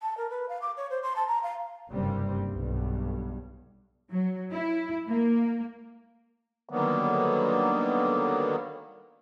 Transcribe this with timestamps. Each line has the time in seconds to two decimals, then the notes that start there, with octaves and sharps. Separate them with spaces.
0.01 A5
0.17 A#4
0.30 B4
0.49 F5
0.61 D6
0.77 C#5
0.90 C5
1.02 C6
1.16 A5
1.27 A#5
1.43 F5
1.90 F#1 G2 C3 G3 C4
2.47 B1 G2
4.10 F#3
4.51 E4
5.09 A#3
6.69 D3 D#3 F#3 G3 A#3 B3